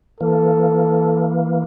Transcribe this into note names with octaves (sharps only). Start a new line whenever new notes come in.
E3 A#3 A4